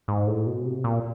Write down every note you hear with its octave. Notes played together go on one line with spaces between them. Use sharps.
G#2
A2
B2
C3
A#2